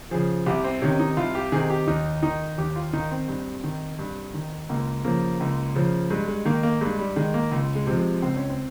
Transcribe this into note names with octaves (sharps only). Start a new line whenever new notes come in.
C#3 F3 G#4
C2 G4
C4
C3 D#3 C#4
D#4
C2 F4
G4
C3 D#3 G#4
G4
D#2 D#4
D#3 D#4
D#2 G4
F4
D#3 D#4
C4
G2
D#3
G2
D#3
C#2 A#3
C#3 F3 A#3
C#2
C#3 F3
G2 G#3
G#3
D#3 A#3
A#3
G2 G#3
G3
D#3 G#3
A#3
C#2
G#3
C3 F3
G#3
C#2 C4
C#4
C4